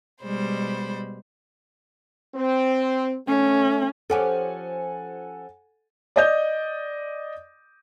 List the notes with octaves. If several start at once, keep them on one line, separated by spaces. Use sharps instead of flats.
B2 G3 G#3 C5 B5
C4
A3 C#4
F3 C#4 G4 A4 F#5 G#5
D5 D#5 G6